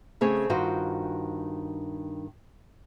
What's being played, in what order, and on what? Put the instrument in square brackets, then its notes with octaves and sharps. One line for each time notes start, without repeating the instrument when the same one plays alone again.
[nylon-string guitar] C#3 A3 C4 G#4 C#5
G2 D#3 F4 F#4 C5 G5